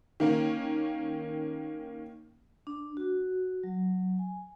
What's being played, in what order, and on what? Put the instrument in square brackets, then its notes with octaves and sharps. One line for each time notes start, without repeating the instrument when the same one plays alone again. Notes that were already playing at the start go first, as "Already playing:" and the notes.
[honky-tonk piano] D#3 A#3 C#4
[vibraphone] D4
F#4
F#3
G#5